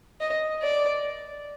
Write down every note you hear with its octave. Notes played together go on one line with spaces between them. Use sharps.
D#5
D5